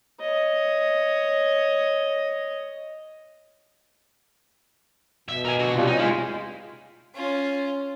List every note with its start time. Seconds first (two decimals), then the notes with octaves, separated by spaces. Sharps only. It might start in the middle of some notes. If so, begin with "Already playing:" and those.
0.20 C#5 D#5
5.29 B2 E5
5.45 A#4 G#5
5.59 D3 F#4
5.74 C2 B2 G3 F4
5.87 C#4 D#4
5.99 G#2 G#3 E4 F4 F5
7.14 C#4 F4